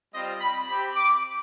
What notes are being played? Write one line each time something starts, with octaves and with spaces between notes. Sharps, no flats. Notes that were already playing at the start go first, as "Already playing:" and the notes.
G3 C4 F4 D#5
B5
C4 G4 B5
D6